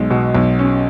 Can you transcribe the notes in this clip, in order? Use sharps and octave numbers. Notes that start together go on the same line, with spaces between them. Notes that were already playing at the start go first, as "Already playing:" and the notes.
Already playing: B1 G#3
B2
B1
C#4